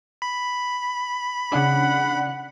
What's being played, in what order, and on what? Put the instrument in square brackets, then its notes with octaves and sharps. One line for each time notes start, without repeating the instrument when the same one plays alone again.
[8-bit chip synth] B5
[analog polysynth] C#3 D4 [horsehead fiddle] F#5